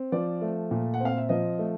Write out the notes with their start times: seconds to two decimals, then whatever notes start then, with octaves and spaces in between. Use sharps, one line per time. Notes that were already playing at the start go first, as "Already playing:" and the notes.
Already playing: C4
0.12 F3 D5
0.42 A3
0.71 A#2
0.94 F#5
1.00 C4 F5
1.17 E5
1.29 F3 D#5
1.59 A3